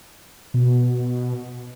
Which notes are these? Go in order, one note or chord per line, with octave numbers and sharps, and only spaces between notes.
B2